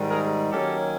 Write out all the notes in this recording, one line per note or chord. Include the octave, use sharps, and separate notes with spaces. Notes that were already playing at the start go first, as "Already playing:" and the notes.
Already playing: G#2 D#3 G3
G#4 A#4
D#3 F#3 A#3 C#4 G4 A4